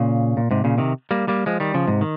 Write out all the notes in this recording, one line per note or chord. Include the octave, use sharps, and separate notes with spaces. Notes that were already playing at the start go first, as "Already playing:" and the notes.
Already playing: A#2 C#3
A#2
G#2 C3
A#2 C#3
C3 D#3
G3 A#3
G3 A#3
F3 G#3
D#3 G3
C#3 F3
G#2 C3
D#3